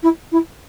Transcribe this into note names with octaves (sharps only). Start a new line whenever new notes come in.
E4
E4